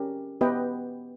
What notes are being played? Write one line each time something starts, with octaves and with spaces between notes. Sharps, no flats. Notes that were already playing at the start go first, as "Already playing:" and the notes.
Already playing: C#4 G4 A#4
B3 G4 B4 D#5 G5